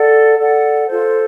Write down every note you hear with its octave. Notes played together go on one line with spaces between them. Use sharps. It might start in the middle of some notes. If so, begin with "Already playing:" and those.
Already playing: A4 D5 F#5
A4 D5 F#5
F4 A4 C5